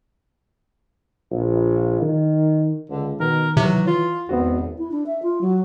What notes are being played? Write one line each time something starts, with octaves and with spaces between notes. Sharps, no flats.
A#1
D#3
C#2 D3
B2 D#3 A#4
C3 E3 F#3
F4
G#1 E2 B3 C4 F#4
E4
D4
E5
F4
F#3